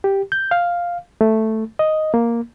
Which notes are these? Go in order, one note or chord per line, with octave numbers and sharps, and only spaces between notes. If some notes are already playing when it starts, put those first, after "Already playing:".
G4
G6
F5
A3
D#5
A#3